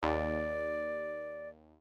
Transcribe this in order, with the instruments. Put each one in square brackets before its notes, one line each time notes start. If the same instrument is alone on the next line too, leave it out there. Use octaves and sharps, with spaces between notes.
[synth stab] D#2 [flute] D5